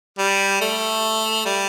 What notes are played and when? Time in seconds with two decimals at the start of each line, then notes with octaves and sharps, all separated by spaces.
0.18 G3
0.61 A3
1.45 G3